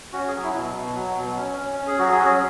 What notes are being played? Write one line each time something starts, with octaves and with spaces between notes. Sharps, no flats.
C#4 F#4
G#4
F#3
E4
B2
B2
F#3
B2
C#4
C#4
C#4
G#4
F#3 F#4
G#4
C#4 F#4